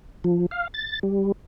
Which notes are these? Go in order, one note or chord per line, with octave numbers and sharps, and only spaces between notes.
F3
F5
A6
G3